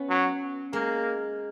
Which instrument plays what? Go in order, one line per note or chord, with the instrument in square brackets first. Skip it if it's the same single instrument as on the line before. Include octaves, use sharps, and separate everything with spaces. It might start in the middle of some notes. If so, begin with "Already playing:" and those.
Already playing: [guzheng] B3 C#4
[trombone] F#3
[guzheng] G#3 [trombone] A#3